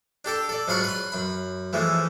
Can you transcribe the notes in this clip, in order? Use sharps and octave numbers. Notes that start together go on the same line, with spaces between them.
D4 G4 A4 G5
A4 D5
G#2 F#3 F4 F5 B5 C#6
B4 C6
F#2 B5
E3 F3 G#3 A3